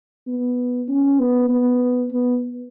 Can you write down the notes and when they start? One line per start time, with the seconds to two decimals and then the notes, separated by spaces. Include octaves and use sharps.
0.27 B3
0.88 C#4
1.19 B3
1.49 B3
2.11 B3